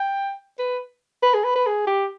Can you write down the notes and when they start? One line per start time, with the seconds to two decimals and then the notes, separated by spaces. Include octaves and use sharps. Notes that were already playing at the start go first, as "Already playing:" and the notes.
Already playing: G5
0.59 B4
1.23 B4
1.34 G#4
1.44 B4
1.56 B4
1.67 G#4
1.87 G4